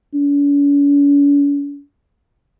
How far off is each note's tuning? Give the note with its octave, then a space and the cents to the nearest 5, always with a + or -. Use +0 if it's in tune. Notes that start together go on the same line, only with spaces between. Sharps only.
C#4 +45